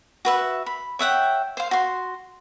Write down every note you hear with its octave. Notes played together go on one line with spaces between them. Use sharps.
F#4 B4 E5
B5
C#5 E5 F#5 G5
C5 F5
F#4 C6